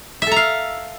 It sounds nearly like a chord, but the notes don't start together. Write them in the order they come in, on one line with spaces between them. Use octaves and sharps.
E5 A4 A#5 F5